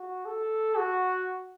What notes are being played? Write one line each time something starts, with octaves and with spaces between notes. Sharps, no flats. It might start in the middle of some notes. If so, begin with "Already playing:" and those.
Already playing: F#4
A4
F#4